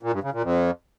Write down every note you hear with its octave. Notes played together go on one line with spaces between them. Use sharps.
A#2
G2
C#3
A#2
F2